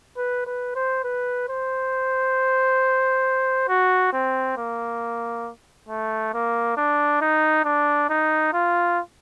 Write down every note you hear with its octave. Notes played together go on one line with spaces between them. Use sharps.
B4
B4
C5
B4
C5
F#4
C4
A#3
A3
A#3
D4
D#4
D4
D#4
F4